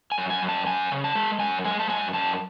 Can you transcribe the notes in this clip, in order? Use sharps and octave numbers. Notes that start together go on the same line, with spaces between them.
G#5
F#2
G#5
F#2
A5
F#2 G#5
C#3
A5
G#3
F#2 G#5
G#3 G#5
A5
F#2 G#5
F#2 A5